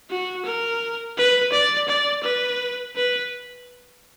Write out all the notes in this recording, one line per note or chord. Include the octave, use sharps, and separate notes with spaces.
F#4
A#4
B4
D5
D5
B4
B4